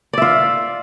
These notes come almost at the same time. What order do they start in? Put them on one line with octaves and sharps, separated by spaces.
D5 E5 F4